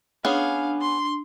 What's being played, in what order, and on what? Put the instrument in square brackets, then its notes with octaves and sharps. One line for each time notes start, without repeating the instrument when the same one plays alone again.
[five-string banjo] B3 C#4 G#4 [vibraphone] D4 [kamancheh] F5
[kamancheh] C6